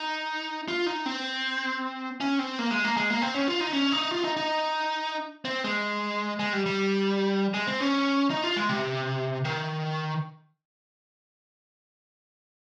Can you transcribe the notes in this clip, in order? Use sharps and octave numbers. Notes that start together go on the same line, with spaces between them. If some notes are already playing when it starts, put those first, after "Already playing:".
Already playing: D#4
F4
D#4
C4
C#4
C4
A#3
G#3
A#3
G#3
A#3
C4
C#4
F4
D#4
C#4
D#4
F4
D#4
D#4
C4
G#3
G#3
G3
G3
G#3
C4
C#4
D#4
F4
G#3
C3
D#3